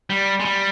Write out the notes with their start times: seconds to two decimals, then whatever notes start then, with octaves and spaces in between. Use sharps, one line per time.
0.10 G3
0.40 G#3
0.45 G3